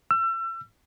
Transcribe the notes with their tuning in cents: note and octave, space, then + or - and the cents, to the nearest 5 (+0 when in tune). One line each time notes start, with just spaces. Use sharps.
E6 +35